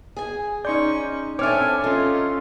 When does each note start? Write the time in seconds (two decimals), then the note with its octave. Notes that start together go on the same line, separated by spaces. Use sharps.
0.17 G#4 G#5
0.65 C#4 D#4 D5 C6 C#6 G6
1.39 C4 D4 A4 C#5 E5 G#5 D6 F6
1.84 C#4 D#4 F4 A4